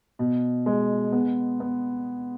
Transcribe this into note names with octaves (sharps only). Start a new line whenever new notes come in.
B2
G#3
B3
B3